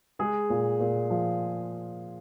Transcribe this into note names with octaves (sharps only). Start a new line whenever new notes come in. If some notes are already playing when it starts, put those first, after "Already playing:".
G#3 G#4
A#2
A#2
F3